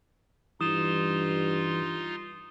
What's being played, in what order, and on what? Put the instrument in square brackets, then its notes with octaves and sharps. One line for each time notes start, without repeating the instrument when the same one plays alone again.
[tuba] G2 [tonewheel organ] E3 [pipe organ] D#4 F4 C6 [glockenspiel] D#6 E7